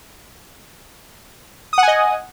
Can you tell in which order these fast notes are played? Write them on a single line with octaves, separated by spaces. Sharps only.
D#6 F#5 G#5 D#5